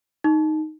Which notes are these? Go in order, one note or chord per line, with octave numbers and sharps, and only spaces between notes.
D#4